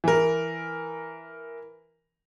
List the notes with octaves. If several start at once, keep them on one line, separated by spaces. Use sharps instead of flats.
E3 A#4